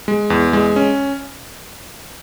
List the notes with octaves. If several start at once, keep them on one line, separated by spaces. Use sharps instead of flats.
G#3
E2
G#3
C#4